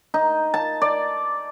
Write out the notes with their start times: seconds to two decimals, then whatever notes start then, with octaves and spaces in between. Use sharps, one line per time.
0.14 D#4
0.54 A5
0.82 D5